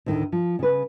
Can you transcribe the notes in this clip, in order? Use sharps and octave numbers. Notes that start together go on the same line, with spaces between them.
D2 A2 D#3 A3
F3
C#3 B4